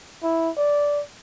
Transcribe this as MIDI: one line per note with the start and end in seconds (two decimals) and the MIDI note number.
0.23 0.50 64
0.57 1.02 74